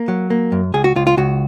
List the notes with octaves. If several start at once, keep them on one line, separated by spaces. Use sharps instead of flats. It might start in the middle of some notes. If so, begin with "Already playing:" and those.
Already playing: A#3
F#3
A#3
F#2
C#2 G#4
F#4
C#2 F4
F4
C#2 F#4